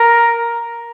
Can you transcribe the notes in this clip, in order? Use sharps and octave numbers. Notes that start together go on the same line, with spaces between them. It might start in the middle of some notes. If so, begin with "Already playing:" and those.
Already playing: A#4